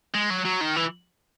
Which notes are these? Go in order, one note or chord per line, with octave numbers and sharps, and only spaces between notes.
G#3
F#3
F#3
D#3
E3